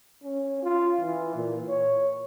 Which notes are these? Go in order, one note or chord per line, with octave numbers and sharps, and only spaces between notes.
C#4
F4
E3
A#2
C#5